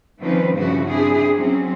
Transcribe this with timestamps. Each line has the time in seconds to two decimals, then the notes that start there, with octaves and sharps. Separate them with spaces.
0.21 D#3 F3 G3 C4 C#4 B4
0.55 G2 C#3 F3 G3 E4 F#4
0.89 C4 D4 E4 G4 G#4
1.35 F#3 C4 C#4